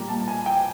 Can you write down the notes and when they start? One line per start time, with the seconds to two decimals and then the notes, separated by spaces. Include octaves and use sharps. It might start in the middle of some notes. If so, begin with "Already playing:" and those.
Already playing: A#2 G3 A#3
0.09 A5
0.28 G#5
0.46 G5